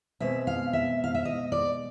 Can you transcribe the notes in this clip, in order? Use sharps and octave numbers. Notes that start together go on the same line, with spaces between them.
B2 G#3 C4 E5
F5
E5
F5
E5
D#5
D5